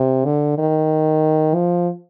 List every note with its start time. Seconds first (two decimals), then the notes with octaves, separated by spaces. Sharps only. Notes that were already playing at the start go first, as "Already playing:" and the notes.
Already playing: C3
0.25 D3
0.58 D#3
1.55 F3